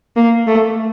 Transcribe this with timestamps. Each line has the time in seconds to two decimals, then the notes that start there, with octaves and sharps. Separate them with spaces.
0.17 A#3
0.47 A3